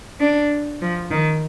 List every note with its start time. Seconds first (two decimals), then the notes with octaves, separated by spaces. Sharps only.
0.20 D4
0.81 F3
1.11 D#3